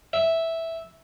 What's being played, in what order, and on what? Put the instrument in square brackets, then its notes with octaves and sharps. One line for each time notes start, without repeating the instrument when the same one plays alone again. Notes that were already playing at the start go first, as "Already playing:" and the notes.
[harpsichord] E5